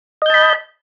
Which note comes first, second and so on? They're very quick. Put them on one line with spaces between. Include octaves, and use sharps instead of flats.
D#5 G6 A5 B5